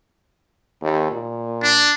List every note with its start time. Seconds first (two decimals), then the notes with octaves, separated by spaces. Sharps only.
0.82 D#2
1.11 A#2
1.63 D4